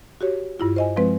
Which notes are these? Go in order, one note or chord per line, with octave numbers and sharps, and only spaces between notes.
F#4 G4 C#5
G2 E4 F4
C5 D#5 G#5
F3 G#3 C4 B4